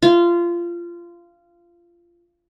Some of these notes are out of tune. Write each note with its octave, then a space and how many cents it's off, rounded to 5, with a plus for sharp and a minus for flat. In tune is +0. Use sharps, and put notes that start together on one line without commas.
F4 -20